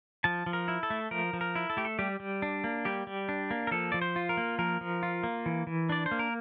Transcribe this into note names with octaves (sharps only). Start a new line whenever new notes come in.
F3 A5
F3
A#4
E4
A4
A3
F3 A#4
F3
A#4
E4
A4
A3 G4
A4
G3 G4
G3
D4
A#3
G3 G4
G3
D4
A#3
A#4
F3 A4
F3 D5
C5
F4
A#4
A#3
F3 A#4
F3
F4
A#3
E3
E3
D4 D5
C5
A#3
A#4